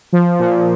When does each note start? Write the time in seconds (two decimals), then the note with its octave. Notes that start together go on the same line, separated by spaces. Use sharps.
0.13 F3
0.39 A#2